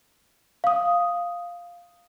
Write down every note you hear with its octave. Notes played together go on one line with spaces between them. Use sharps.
F5 D#6